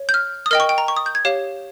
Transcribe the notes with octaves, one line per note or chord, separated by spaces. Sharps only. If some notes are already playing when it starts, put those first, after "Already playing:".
Already playing: C#5
G6
F6
D#6
A#4 D#5 G5 F6
C#6
G5
A#5
C#6
D#6
G6
G#6
G4 C#5 F5